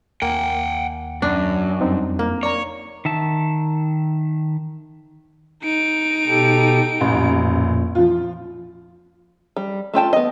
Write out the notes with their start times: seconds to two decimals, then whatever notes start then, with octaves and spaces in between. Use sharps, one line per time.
0.22 D#2 A#3 F#5 G5
1.22 F#2 D4
1.80 F2 G3 C4 D#4
2.19 A#3
2.43 C#5 D5 A#5
3.05 D#3 E5 A5
5.63 D#4 D7
6.27 B2 G4 A4
7.01 A1 F2 A#2
7.95 F3 F4
9.57 G3
9.94 A3 F4 G5 A5
10.13 B3 D#5